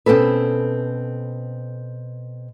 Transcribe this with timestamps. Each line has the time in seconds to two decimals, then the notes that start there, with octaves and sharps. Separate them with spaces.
0.06 B2 C4 C#4 A4 B4